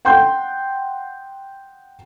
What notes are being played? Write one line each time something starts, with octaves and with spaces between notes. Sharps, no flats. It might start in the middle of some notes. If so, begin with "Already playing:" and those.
F#5 G5 C6 G6